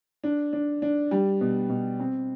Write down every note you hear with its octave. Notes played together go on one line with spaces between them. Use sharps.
D4
D4
D4
G3
B2
B2
C4